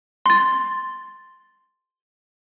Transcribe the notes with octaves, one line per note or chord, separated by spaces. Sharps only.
C6 A6